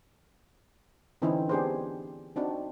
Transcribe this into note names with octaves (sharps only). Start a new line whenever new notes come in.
D3 E3 C4 C#4 D#4 E4
B3 D4 G4 G#4 B4 C5
C4 D4 D#4 F#4